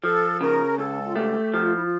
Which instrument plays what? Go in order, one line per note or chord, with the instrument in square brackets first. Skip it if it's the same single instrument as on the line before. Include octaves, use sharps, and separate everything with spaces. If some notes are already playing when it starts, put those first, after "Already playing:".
[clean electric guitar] F3 [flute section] A4
[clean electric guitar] C#3 [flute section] A#4
[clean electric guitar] C#2 [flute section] A4
[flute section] F4
[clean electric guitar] A3 [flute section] G4
[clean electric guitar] F3 [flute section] G4
[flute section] F4
E4
F4